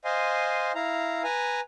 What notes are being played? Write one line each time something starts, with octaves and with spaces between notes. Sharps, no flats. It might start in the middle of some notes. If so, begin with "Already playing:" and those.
C5 D#5 F5 G#5 C6
E4 F5 A#5
B4 G#5 A#5